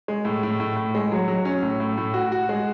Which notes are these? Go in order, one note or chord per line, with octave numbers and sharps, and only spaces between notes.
G#3
A2
A2
A2
A2
G#3
F#3
F#3
C#4
A2
A2
A2
F#4
F#4
G#3